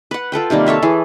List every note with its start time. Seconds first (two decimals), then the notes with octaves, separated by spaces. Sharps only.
0.11 B4 F#5
0.32 F4 A4 B4 G5
0.50 C3 D#3 G3 A#3
0.66 A4 C#5 E5 F5
0.83 E3 G#4 A4